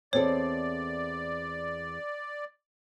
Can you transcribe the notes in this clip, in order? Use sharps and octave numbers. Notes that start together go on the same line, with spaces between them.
E2 C4 A4 C#5 D5